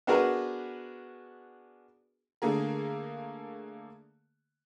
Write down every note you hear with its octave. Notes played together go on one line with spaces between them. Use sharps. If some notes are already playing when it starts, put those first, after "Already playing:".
B3 D4 F#4 G#4 A#4 B4
D3 A3 A#3 G#4 A#4